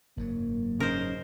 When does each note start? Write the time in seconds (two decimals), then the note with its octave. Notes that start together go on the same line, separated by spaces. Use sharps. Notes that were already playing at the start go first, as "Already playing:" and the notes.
0.17 F#1 G#2 F#3 A#3
0.80 C#3 C#4 D#4 A#4 C5